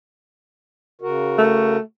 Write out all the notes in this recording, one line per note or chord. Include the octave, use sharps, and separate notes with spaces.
C#3 F#4 A#4
A3